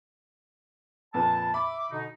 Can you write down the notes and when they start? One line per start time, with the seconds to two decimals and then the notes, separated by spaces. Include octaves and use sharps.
1.14 F2 A#2 B4 A5
1.54 E5 B5 D6
1.91 B2 D3 D#4